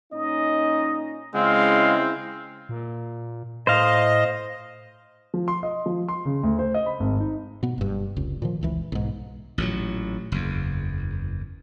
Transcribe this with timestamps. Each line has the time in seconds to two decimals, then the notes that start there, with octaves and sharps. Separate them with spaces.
0.13 A#2 C#4 D#4 D#5
1.35 C#3 G#3 C4 E4 F5
2.69 A#2
3.67 A2 C5 D#5 F5
5.34 F3
5.48 C6
5.63 D#5
5.86 F3
6.09 C6
6.25 C#3
6.43 D2
6.59 C5
6.74 D#5
6.86 B5
7.00 G#1
7.20 D#4
7.63 B2 B3
7.78 F#1 G2
8.16 F1 C#2
8.42 A#2 D#3 F3
8.61 F1 C#2 E3
8.92 B1 G#2
9.58 A1 A#2 D3 F#3
10.32 F#1 E2